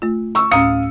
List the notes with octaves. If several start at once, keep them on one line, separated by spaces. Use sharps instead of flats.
A3 F4
C#6 E6
D2 A2 C#4 F5 D#6 C#7